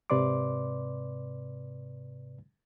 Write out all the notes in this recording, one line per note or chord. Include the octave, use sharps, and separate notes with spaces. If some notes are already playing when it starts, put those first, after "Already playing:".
G#2 C3 B4 D5 C6 D6